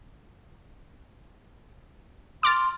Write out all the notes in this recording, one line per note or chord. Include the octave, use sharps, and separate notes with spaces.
C6 D6 F6 A6